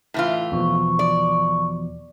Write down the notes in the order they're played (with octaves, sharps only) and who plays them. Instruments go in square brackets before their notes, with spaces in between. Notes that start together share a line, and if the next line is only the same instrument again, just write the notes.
[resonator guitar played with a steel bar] A2 E3 F4
[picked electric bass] E2 B2 F3 [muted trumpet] C#6
[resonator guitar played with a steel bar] D5